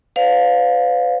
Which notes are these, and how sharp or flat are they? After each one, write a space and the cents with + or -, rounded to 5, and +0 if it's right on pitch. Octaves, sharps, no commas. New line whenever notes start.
B4 +45 D5 -40 F5 +20